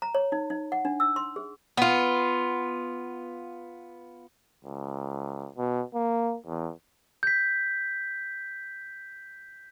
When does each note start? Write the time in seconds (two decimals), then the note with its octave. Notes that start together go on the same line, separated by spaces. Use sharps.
0.02 A#5
0.15 C#5
0.32 D#4
0.50 D#4
0.72 F#5
0.85 D4
1.00 E6
1.16 C6
1.36 G#4
1.77 B3 F4
4.65 C#2
5.58 B2
5.94 A#3
6.47 E2
7.23 G6 B6